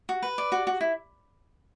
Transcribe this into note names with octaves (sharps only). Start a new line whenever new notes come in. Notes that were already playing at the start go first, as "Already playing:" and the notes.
F#4
B4
D5
F#4
F#4
E4